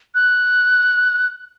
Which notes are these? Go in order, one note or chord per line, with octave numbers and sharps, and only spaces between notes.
F#6